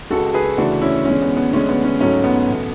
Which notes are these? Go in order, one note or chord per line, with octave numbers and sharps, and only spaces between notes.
C#2 C#3 G#3 F#4 A4
G#4 B4
D2 C#3 E3 A3 D4 F#4
C#4 E4
E2 D3 G#3 C#4
B3
B3
D2 D3 G#3 C#4
B3
C#4
G#2 F#3 A3 C#4
B3
E2 B2 A3